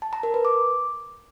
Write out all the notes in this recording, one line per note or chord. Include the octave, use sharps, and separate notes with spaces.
A5
A#5
A#4
B4
D6